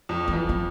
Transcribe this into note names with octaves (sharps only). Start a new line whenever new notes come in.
F2
F3
F2 E3
F3